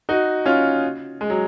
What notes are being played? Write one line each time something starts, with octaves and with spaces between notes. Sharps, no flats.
D#4 F#4
C#4 F4
G#3
F#3